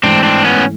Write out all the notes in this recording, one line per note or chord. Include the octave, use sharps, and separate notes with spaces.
G#2 E3 A3 C4 D4
C4 D4
B3 C#4